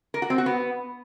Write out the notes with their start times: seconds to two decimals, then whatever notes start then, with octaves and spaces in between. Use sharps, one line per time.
0.14 A#4
0.22 F#4
0.30 C4
0.38 F#4
0.46 B3